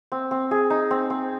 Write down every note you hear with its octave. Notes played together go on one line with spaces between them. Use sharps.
C4
C4
G#4
D#4
C4
C4